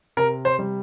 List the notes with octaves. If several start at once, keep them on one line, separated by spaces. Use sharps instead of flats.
C3 A#4
C5
G3